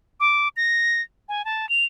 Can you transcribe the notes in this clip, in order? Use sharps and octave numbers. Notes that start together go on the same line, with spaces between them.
D6
A#6
G#5
A5
F7